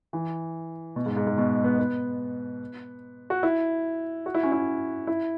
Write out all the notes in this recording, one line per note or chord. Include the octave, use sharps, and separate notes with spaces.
E3
B2
G#2
G#2
G#2
B2
B3
B3
F#4
E4
F#4
E4
C#4
E4
E4